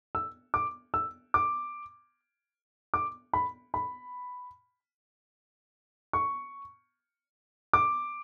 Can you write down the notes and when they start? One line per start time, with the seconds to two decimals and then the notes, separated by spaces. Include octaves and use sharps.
0.15 E6
0.54 D6
0.94 E6
1.34 D6
2.94 D6
3.33 B5
3.74 B5
6.13 C#6
7.73 D6